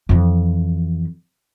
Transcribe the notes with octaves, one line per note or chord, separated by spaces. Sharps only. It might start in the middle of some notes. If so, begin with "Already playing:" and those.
F2 E3